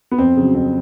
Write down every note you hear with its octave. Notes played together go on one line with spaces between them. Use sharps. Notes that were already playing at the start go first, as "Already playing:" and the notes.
B3
F2 C4
C#3 F#3
F2 C4